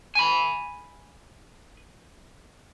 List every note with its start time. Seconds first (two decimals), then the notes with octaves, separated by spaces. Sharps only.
0.15 G#5 B5